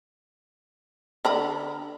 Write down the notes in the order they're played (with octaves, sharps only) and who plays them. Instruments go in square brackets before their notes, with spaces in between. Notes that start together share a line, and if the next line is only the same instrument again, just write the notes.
[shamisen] D3 A#5 B5